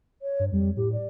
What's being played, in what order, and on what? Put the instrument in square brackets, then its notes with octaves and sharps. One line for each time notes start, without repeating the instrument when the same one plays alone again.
[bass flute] C#5
[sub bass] G2
[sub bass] F2 [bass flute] G3
[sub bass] A2 [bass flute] G4
[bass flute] D5